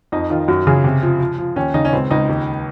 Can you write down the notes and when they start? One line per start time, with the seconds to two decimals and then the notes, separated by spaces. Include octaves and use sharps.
0.12 F2 D#4
0.30 D#3 F4
0.48 F#2 F#4
0.67 C#3 G#4
0.84 C3
1.03 F3
1.20 F3
1.38 F3
1.56 D#2 C#4
1.74 C#3 D#4
1.85 C#4
1.92 C#2 C4
2.10 C#2 D#4
2.29 D#2